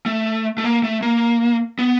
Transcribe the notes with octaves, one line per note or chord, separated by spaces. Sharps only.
A3
A3
A#3
A3
A#3
B3